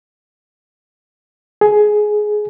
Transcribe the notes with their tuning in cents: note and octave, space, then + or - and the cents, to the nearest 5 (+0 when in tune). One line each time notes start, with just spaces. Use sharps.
G#4 +15